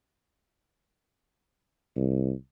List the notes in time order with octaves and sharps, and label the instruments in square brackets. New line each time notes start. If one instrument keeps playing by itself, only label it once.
[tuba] C2